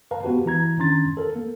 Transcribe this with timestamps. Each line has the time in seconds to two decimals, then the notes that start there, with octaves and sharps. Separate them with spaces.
0.11 A#4 B4 F5 A5 A#5
0.23 B3 F#4 G4 B4
0.46 E3 E4 A#5 G#6
0.78 D#3 C#4 D4 A#5 C6 A6
1.17 A4 A#4
1.36 A#3